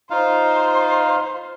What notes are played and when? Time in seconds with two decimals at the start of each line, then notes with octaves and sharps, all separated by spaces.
0.10 D#4 F4 C5 F5